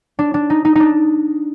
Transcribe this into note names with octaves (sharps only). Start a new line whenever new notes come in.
D4
D4
D#4
D#4
D4 D#4